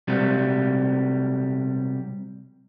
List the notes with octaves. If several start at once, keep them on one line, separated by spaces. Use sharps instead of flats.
C3 F#3 G3